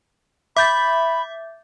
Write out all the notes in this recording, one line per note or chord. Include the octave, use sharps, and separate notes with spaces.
E5 B5 D6 G6 A6